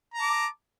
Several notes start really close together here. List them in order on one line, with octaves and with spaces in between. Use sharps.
A#5 A5 D6